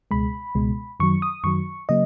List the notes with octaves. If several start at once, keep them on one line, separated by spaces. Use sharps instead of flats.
C#2 B2 G#3 B5
C#2 B2 G#3
F#2 D#3 F#3 C#6
D#6
F#2 D#3 F#3 C#6
C#3 F#3 A#3 D#5